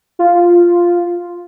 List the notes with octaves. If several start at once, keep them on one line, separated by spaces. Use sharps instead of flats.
F4